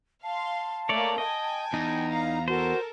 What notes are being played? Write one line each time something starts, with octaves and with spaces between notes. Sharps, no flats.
F5 A5 C6
A3 A#3 C#5 D5
D#5 G5 G#5
E2 D#4
F5 A#5
F#4 A4 A#4 C5